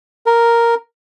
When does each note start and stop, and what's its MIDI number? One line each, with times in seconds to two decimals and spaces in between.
0.26 0.75 70